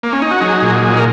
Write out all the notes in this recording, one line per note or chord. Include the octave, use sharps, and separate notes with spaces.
A#3
C#4
D#4
F#4
F#3 D#4 G#4
A#2
F#3
A#4